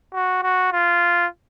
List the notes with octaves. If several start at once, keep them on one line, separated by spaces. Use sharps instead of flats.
F#4
F#4
F4